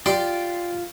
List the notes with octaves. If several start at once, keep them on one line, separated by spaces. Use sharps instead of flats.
F4 G4 D5 C6